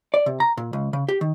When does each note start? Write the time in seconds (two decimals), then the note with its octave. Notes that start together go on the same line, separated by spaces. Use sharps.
0.14 D5
0.26 C3
0.40 A#5
0.57 A#2
0.73 C#2
0.93 C#3
1.09 G4
1.21 D#3